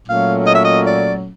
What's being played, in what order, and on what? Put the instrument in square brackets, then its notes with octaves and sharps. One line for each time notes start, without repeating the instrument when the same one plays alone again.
[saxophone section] A#2 F#3 A3 C#4 F5
D#5
E5
D#5
D5